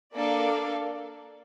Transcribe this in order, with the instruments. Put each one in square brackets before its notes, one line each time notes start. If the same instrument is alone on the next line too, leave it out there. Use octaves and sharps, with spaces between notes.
[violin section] A#3 D4 A4 D5 F5